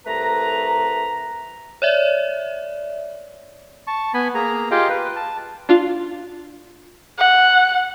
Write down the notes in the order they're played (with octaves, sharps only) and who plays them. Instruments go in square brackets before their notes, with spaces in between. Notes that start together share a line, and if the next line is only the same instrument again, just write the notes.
[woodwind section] C2 A3 B4 A#5
[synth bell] C#5 D5 E5
[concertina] A5 C#6
B3 G#5 B5
A#3 G#4 A#5
F4 G4 G#4 D#5 F5 G5
B4
A5
[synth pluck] D4 F4 F5
[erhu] F#5